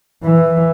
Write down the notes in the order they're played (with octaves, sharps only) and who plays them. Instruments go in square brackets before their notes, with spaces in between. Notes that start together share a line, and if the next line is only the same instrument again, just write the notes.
[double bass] E3